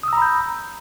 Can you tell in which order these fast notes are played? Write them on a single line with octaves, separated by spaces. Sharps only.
D#6 E6 A#5 B5 G6